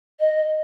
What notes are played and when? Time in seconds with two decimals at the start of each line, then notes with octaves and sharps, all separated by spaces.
0.20 D#5